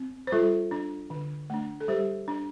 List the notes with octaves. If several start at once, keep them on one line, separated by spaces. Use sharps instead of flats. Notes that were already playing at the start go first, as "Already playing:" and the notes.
Already playing: C4
C5
G3 F4 A4
D4
D3
A3 D4
A4
G3 G4 C5
D4